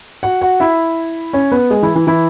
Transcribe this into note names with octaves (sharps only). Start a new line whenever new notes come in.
F#4 F#5
F#4 F#5
E4 E5
C#4 C#5
B3 B4
G#3 G#4
E3 E4
E3 E4
E3 E4